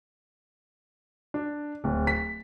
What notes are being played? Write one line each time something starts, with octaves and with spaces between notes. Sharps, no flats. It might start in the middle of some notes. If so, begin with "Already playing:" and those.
D4
D1
B6